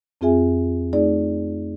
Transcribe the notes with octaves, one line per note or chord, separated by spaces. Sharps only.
F2 C4 F4 G#4 E5 G#5
A3 D#4 G#4 D5